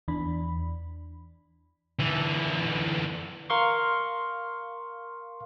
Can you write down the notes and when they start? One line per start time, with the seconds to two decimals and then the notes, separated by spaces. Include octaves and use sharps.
0.08 E2 E3 D4 B5
1.99 D3 E3
3.50 A#4 F5 C6 C#6